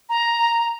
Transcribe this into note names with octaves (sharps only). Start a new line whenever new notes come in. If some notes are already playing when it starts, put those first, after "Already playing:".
A#5